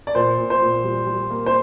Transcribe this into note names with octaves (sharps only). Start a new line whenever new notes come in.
D5
A#2 C5
A#2
C5
A#2
G3
G3
A#3
C5